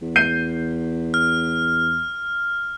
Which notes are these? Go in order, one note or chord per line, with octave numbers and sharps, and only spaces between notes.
E2
G6 C7 D#7
F6